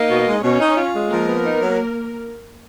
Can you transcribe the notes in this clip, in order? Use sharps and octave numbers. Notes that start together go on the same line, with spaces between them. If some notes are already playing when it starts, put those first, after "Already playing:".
Already playing: A#3 D#4 D#5
B2
G#3
B2 C#4 C#5
D#4
F4
G#3
F3 A#3 A#4
B3
D#4
F#3